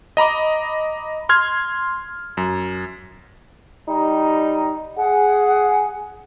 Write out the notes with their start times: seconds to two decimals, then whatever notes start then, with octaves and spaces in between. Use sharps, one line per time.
0.17 D#5 A#5 B5 D6
1.29 C6 F6 G#6
2.37 F#2
3.88 G3 D#4
4.97 G#4 F#5